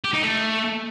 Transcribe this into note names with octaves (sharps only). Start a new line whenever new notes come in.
G4
D#4
A3